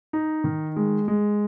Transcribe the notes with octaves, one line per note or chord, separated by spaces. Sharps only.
D#4
D#3
G#3
G#3